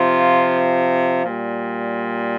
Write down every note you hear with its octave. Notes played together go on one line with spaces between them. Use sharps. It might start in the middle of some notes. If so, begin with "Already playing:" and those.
Already playing: C3 F3 F4
A#2 G3